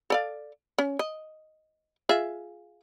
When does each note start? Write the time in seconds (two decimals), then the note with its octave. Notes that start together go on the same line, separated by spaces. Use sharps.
0.10 A4 D5 F5
0.78 C#4
0.99 D#5
2.09 F4 G#4 E5